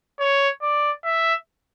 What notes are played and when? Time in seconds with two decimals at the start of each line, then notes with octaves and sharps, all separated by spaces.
0.20 C#5
0.62 D5
1.04 E5